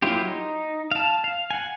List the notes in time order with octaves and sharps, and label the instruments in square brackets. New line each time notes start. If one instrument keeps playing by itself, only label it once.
[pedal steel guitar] F#3 A#3 E4 F4 G4
D#4
F5 A5
F5
F#5 G#5